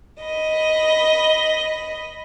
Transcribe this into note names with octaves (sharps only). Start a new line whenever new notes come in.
D#5 B5